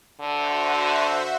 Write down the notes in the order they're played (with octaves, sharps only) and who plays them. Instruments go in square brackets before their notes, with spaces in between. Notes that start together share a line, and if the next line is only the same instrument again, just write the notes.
[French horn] D3 [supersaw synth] F#4 C5 E5